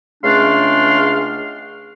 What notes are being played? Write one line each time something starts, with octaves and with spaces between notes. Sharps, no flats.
C#2 C#3 A3 D4 F5 C6